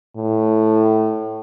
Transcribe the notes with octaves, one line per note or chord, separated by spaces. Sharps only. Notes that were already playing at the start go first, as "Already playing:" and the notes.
A2